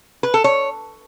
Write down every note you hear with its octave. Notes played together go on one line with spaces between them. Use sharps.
B4
A4
C#5